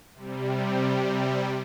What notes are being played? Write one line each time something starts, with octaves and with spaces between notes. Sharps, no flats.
C3 G3